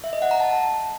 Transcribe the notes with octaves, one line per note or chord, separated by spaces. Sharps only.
E5
D#5
F#5
A#5
A5